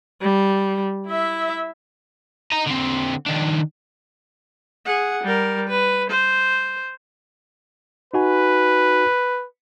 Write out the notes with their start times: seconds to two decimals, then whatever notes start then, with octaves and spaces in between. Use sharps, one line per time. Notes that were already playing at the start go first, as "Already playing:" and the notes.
0.22 G3
1.06 E4 E5
2.52 D#5 A#5
2.66 D3 C4
3.26 D#3 D4
4.86 G#4 F#5
5.24 G3 A#4
5.69 B4
6.10 C5
8.14 D#4 F#4 B4 G#5